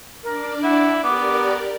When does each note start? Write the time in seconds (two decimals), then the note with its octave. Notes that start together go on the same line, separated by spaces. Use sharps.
0.23 D4 A#4 D5
0.63 E4 F#5
1.04 B3 G4 A#4 D5 D6